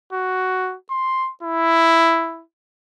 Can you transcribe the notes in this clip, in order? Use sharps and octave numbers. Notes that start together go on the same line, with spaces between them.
F#4
C6
E4